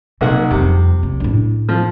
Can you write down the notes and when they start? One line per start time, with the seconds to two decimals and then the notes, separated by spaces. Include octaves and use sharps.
0.21 B1 C3 A#3 F#5
0.51 F2 C3 G3
1.03 C2
1.20 A2 D4
1.69 F3